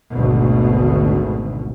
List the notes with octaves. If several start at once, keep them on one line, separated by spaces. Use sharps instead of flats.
G#1 D2 B2